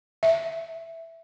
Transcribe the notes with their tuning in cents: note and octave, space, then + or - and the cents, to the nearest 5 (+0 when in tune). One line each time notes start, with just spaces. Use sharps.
E5 +0